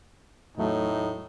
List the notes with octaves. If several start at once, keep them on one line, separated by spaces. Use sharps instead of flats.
E2 A2 F#3 A3 D#4